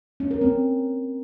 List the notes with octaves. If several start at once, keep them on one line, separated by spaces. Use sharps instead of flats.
C#4
A#4
C4